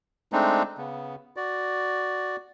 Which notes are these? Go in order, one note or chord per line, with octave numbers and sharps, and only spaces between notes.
G#3 A3 C4 D4 D#4
C#3 B3
F#4 D5